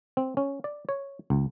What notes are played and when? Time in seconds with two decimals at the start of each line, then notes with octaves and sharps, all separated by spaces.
0.17 C4
0.37 C#4
0.64 D5
0.89 C#5
1.30 C#2